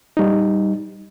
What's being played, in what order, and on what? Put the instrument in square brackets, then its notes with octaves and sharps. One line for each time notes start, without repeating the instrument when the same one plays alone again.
[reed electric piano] G3 D#4